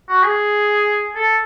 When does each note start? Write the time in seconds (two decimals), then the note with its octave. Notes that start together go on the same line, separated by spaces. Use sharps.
0.08 F#4
0.23 G#4
1.15 A4